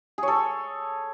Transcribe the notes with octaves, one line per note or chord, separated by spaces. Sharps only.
G#4 A4 C#5